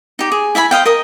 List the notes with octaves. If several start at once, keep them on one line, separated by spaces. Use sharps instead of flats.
D#4 G4
G#4
E4 E5 G#5 B5
C5 D#5 F5 G5
A#4 D#5 D#6